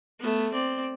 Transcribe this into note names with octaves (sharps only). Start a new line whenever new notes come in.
A3 B3
C4 D5